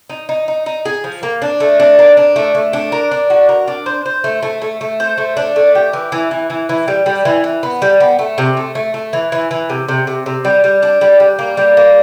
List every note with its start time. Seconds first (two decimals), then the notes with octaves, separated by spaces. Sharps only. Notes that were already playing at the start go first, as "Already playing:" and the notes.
0.10 D#4
0.29 D#4
0.48 D#4
0.66 D#4
0.86 G#4
1.04 F3
1.23 A#3
1.42 D4
1.60 A3
1.80 D4
1.99 A#4
2.17 D4
2.36 A3
2.55 A3
2.73 D4
2.92 A#4
3.11 D4
3.30 F#4
3.49 A#4
3.68 D4
3.86 C5
4.06 C5
4.24 A3
4.43 A3
4.62 A3
4.81 A3
5.00 C5
5.18 A3
5.37 D4
5.56 A3
5.75 G4
5.93 E3
6.12 E3
6.31 E3
6.50 E3
6.69 E3
6.88 G3
7.06 G3
7.25 E3
7.44 E3
7.63 B3
7.82 G3
8.00 B3
8.19 A3
8.38 C3
8.57 A3
8.75 A3
8.94 A3
9.13 E3
9.32 E3
9.51 E3
9.70 C3
9.89 C3
10.07 C3
10.26 C3
10.45 G3
10.64 G3
10.83 D4
11.01 G3
11.20 G3
11.39 A#3
11.57 G3
11.77 A#3